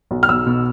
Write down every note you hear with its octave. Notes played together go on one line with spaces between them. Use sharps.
B1
F6
B1 E6
B2